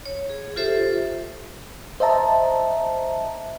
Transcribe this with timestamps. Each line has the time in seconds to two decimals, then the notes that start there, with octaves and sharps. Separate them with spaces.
0.06 C#5
0.30 G#4
0.56 F4 G4 A4 C5 E5
2.00 C5 D#5 E5 A5 A#5